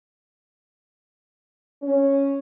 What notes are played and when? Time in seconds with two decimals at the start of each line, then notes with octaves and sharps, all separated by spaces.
1.83 C#4